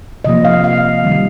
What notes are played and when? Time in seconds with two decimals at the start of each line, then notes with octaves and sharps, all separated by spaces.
0.24 C3 F3 A#3 D#5
0.45 F5
0.64 F5
1.03 D#3 G3 C4